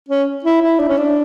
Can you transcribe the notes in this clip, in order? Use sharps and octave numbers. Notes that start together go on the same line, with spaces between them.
C#4
E4
E4
D4
C#4
D4